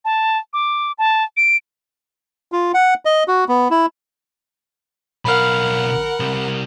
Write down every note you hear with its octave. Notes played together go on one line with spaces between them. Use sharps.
A5
D6
A5
D7
F4
F#5
D#5
F#4
B3
E4
B1 A#4 F5 F#5 B5 F6
C3 G3